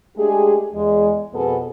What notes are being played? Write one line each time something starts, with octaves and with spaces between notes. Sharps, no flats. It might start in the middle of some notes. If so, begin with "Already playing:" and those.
G#3 A3 D4 G4 G#4
E2 G#3
F2 B2 B3 G#4 A4 B4